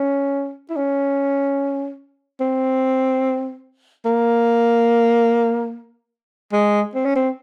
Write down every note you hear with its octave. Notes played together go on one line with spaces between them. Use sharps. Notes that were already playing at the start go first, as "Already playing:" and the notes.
Already playing: C#4
E4
C#4
C4
A#3
G#3
C4
C#4
C4